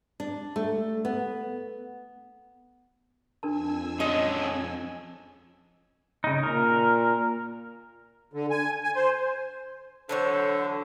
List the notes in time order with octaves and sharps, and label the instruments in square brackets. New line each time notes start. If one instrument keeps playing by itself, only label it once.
[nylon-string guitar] D4
A3
B3
[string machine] F2 G#5 E6 [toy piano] D4 A#4 A5
[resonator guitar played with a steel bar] G#3 D#5 [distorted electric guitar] C#4 A4
[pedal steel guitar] C#3 D#4
[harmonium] A#2 [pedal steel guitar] A#4
[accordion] D3
G#5
G#5
C5
[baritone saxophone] D3 [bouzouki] E3 F#3 C#5 [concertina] A4 [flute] C5